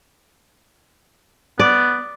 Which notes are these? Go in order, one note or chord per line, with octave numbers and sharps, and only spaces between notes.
B3 D5